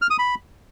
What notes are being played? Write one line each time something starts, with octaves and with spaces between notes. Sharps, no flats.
F6
D#6
B5